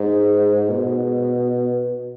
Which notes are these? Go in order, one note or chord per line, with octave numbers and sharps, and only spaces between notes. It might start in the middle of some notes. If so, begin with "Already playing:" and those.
Already playing: G#2
B2